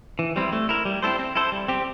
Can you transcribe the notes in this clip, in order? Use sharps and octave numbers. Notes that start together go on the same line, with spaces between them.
E3
G3 C4 E4
A3
E4 A#4
G3
C4 E4 A4 C5
C4
E4 A4 C5
G3
C4 G4